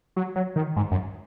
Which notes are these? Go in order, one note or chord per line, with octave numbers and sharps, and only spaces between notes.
F#3
F#3
D#3
G#2
F#2